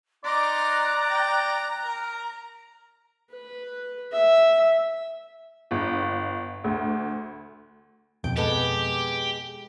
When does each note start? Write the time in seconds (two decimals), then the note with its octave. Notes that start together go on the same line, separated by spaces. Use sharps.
0.25 D#4 D5 A#5 C6 D6 F#6
1.10 G5
1.84 A#4
3.32 B4
4.12 E5
5.71 G1
6.64 D2
8.24 F2 B2 G5
8.37 G#3 B3 G4 A4